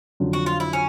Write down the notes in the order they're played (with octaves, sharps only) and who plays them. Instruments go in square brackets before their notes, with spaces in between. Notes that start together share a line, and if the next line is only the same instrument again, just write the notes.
[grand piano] F2 D3 F#3
[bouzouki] F#4
F4
E4
C#4